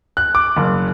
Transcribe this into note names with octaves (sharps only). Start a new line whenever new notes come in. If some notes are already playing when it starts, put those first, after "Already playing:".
F#6
D6
F#1